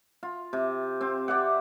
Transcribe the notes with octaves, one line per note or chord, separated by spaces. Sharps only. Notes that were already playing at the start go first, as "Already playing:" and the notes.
F4
C3
C4
G4 D5 E5 F#5